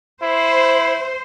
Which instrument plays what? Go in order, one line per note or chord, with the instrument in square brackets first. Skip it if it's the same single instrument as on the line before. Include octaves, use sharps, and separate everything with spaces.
[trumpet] E4 [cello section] C5